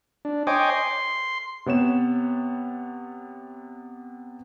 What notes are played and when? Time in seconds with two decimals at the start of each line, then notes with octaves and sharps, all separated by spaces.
0.25 D4
0.47 C5 C#5 D#5 G5 G#5 D6
0.70 C6
1.66 C3 B3 C#5 E7